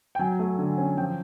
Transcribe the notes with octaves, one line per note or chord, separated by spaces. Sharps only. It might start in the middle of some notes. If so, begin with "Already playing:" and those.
G5
F#3 G#5
A3
D3
C#4
F3 G5